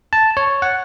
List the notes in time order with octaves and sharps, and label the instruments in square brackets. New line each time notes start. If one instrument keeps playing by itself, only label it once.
[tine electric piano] A5
C#5
F#5